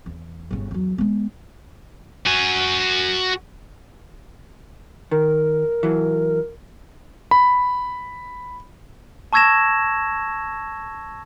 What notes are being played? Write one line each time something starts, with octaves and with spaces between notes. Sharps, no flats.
E2
G1 C#3
E2 F#3
G#3 B3
F#4 G#5
D#3 A#4
E3 F#3
B5
A5 C#6 E6 G#6 A#6 E7